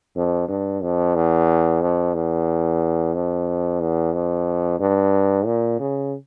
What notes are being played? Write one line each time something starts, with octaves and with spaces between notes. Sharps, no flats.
F2
G2
F2
E2
F2
E2
F2
E2
F2
G2
A#2
C#3